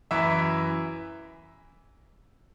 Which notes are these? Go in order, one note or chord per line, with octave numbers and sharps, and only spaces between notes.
F#2 E3 E5